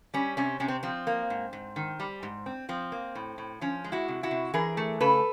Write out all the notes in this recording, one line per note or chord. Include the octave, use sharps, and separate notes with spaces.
G3 C#4
C3 C#4
C3 C#4
C4
F3 C4
A#3
G#2
G#2
D#3
G3
G#2
C4
F3 C4
A#3
A2
A2
F3 C#4
G#3
E4 F#4
C3
E4 F#4
C3
E3 G#4 A#4
A3
C#3 A4 B4